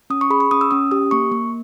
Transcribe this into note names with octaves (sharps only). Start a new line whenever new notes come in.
C#4 D#6
C#6
G#4 B5
C#6
C#4 D#6
E6
C#4 D#6
G4 D#6
A#3 C#6
A#3